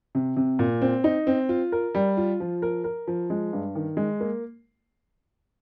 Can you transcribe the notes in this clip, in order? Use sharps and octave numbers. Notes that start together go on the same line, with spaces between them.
C3
C3
A#2
C4
D#4
C4
F4
A#4
G3
F4
F3
A#4
A#4
F3
G#3
G2
D#3
G#3
A#3